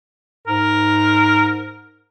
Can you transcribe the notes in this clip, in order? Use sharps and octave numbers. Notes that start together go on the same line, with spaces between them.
G#2 A#4